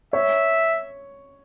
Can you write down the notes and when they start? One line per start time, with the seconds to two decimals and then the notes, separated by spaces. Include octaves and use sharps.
0.13 C#5 E5